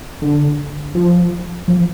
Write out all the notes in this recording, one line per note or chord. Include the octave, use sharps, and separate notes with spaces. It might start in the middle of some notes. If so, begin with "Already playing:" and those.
D3
F3
F3